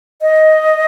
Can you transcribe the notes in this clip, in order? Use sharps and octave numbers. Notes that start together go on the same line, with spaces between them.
D#5